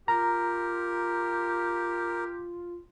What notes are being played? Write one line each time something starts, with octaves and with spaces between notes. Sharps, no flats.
F4 G4 A#4 A#5